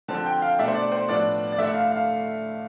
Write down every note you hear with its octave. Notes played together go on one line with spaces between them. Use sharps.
D3 F3 C4 A5
G5
F5
B2 A3 D4 E5
C5
D5
C5
A2 F3 B3 D4 D5
D5
D3 A3 E4 E5
F5
F5